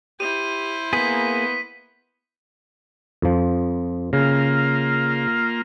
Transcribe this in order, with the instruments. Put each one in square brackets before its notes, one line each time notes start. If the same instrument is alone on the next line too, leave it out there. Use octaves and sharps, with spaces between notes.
[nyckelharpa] E4 C5 [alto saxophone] G4 [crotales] D#7
[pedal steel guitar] A#3 G#4 [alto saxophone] B3 [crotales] B6
[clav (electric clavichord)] F2 F3
[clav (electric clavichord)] C#3 [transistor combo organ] A#3 F4